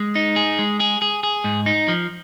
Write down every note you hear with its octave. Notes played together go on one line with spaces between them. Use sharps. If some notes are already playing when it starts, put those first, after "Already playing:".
Already playing: G#3
D#4
G#4
G#3
G#4
G#4
G#4
G#2
D#4
F3